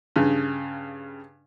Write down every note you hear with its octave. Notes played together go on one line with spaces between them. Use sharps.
G2 C#3